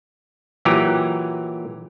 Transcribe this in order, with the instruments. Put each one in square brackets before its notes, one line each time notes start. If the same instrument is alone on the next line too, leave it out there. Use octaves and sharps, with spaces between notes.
[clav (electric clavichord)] A#2 E3 F#3 G4 G#5 A#5